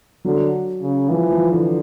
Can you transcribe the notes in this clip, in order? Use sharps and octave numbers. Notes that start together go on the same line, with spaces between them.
D3 F#3
C#3
E3 F3
F3
D3 E3